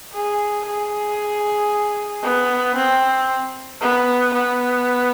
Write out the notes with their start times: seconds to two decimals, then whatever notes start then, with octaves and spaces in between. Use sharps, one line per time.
0.13 G#4
0.66 G#4
2.23 B3
2.76 C4
3.81 B3
4.34 B3